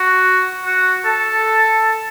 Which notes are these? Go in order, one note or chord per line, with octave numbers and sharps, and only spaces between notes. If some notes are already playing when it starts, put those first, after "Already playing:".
Already playing: F#4
F#4
A4